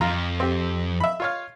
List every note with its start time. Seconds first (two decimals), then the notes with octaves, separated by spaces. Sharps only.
0.01 F2 F4 A#5
0.40 C4 G4
1.00 E5 B5
1.20 F4 C#5 F5